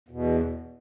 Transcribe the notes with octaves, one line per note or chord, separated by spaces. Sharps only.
E2 B2